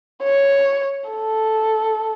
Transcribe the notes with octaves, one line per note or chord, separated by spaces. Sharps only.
C#5
A4